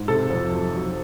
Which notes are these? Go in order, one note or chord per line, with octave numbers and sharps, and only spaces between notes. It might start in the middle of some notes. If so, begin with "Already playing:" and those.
Already playing: G#2
C3 A4
F2
F#3
F#3